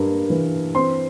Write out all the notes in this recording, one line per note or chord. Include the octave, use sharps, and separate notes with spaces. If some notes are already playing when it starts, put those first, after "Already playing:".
Already playing: G2 A#3
E3
C4 C6